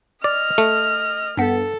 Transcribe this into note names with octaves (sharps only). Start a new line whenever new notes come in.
D5 D#5 F6
A3
G2 B3 A4